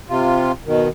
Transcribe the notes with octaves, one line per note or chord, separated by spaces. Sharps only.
C3 F4
B2 D#3